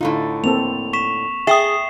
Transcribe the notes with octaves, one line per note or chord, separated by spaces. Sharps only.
A2 D3 D#4 F4
A#3 C4 A4 F7
C#6 B6 E7
G#4 E5 G5 D#6 C7 E7